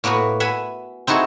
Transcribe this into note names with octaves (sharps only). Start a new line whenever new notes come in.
A2 A#3 B3 F#4 B5
E5 F#5 G#5 B5
C4 D#4 E4 F#4 G#4 A4